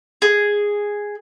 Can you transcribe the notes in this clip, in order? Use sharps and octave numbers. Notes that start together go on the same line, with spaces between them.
G#4